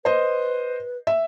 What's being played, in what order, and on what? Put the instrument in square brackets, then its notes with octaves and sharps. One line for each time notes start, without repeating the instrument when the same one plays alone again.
[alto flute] B4 [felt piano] C5 D#5
[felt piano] E5